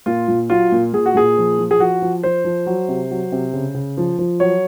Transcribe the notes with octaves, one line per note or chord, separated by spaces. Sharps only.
A#2 F4
A#2
F#3 F4
A#2
A#2 G#4
F#4
A#2 G#4
F3
F3
G#4
F3 F#4
F3
F3 C5
F3
F#3
C3
F#3
C3
C#3
C#3
F3
F3
F#3 C#5